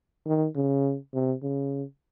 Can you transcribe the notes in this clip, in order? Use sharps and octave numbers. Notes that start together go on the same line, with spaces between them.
D#3
C#3
C3
C#3